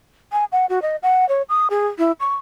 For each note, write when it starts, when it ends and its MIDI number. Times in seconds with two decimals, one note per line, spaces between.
0.32 0.45 80
0.52 0.66 78
0.69 0.82 66
0.82 0.96 75
1.03 1.28 78
1.29 1.42 73
1.49 1.67 87
1.70 1.87 68
1.98 2.12 64
2.20 2.35 85